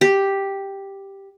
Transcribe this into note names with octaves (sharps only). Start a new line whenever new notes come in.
G4